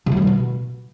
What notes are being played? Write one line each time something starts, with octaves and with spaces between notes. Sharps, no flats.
C3
F#3
A#2
E3
B2